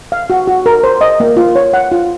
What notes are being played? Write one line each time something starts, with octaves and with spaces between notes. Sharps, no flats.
F5
F#4
F#4
A#4
C5
D#5
A#3
F4
C#5
F#5
F4